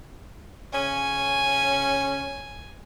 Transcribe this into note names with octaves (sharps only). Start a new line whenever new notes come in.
C#3 C#4 G#5